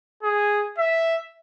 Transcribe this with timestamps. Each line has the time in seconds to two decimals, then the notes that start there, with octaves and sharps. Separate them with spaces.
0.23 G#4
0.78 E5